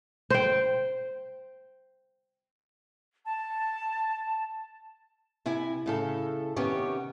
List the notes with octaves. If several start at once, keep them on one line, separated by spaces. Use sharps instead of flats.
C5 G5
A5
C3 E4 G#5
A2 C#3 A4
C3 D#3 B3 C#4 G4 C#5